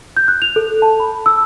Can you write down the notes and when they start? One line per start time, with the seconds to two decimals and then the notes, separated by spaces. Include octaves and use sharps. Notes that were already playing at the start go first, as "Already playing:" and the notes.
0.17 G6
0.28 F#6
0.42 F7
0.56 A4
0.82 A5
1.00 B5
1.26 E6